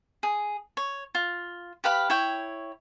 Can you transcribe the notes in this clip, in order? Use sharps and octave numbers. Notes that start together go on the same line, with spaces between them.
G#4
C#5
F4
G4 B4 F5 B5
E4 C#5 G5